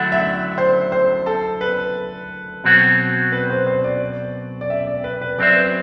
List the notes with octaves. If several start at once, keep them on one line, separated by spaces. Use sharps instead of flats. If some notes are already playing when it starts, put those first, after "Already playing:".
Already playing: D3 F#3 A3 E4 F#5
E5
C5
C5
A4
B4
B2 F#3 C4 F#4
B4
C5
C5
D5
D5
E5
D5
B4
B4
F#3 C4 G4 C5 D5 E5
B4